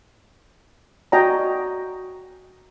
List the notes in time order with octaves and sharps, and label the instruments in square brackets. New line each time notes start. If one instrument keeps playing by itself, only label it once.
[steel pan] F#4 D5 D#5 G5 G#5 A#5